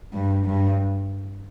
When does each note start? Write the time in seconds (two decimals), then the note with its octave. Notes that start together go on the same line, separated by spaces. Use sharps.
0.13 G2
0.45 G2